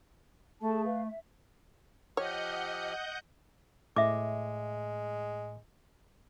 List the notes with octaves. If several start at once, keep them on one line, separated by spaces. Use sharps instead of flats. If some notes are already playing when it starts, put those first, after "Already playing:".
A3 G#4 A4 A5
B4 F5
E5
F3 G4 C#5 D#5 F#5 F6 G6
A2 G#3 E5 D6